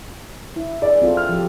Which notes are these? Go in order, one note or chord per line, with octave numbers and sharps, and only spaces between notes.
E4
G#4 D5
C4 F4 A4
F6
F3 G4